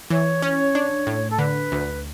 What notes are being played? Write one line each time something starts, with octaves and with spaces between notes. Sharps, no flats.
E3 C#5
C#4
D4
A2
A4
D3 B4
D2